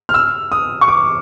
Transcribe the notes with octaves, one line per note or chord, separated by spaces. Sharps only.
F6
E6
D#6
C#6
D6